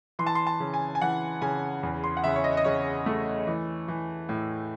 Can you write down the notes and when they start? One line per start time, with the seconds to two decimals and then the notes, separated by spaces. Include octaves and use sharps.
0.19 E3 C6
0.27 A5
0.35 C6
0.47 A5
0.60 C#3
0.74 G#5
0.95 G#5
1.01 E3 F#5
1.42 C#3 G#5
1.83 E2
2.04 C6
2.17 F#5
2.24 C#3 E5
2.36 C#5
2.44 D#5
2.57 D#5
2.64 C#3 C#5
3.06 A3
3.47 E3
3.88 E3
4.29 A2